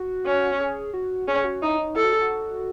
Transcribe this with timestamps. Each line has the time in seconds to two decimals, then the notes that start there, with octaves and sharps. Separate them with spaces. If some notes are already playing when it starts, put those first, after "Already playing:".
Already playing: F#4
0.26 C#4
0.60 G#4
0.94 F#4
1.28 C#4 G#4
1.44 F#4
1.62 D#4 E4
1.78 D#4
1.95 E4 A4
2.04 F#4
2.13 G#4
2.22 F#4